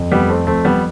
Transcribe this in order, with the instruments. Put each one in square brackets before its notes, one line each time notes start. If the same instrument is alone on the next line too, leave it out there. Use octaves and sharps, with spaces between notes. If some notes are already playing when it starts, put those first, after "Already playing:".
Already playing: [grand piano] F2
[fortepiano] G3 B3
[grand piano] F2
[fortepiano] A3 C4
[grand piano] F2 [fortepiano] A3 C4
[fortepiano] G3 B3